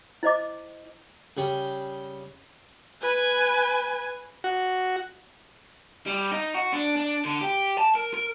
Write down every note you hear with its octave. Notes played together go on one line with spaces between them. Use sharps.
E4 C5 D#5 D6
C#3 G3
B4 G#5
F#4
G3
D#4
F#4
D4
D4
D3
G4
A5
A#4
A#4